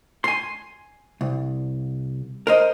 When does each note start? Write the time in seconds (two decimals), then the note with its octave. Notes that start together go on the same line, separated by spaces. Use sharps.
0.24 G#5 C6
1.21 C2
2.47 A#4 C5 D#5